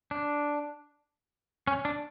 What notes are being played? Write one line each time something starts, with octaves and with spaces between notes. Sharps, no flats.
D4
C#4
D4